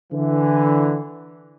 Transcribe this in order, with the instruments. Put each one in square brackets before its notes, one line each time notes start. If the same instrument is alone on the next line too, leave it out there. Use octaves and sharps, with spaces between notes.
[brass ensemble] D3 E3